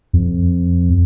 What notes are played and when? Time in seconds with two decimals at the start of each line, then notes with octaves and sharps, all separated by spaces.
0.13 F2